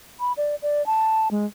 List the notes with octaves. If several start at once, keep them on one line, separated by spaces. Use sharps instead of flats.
B5
D5
D5
A5
G#3